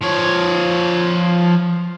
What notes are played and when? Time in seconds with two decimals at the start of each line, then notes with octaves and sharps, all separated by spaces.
0.01 F3 C#5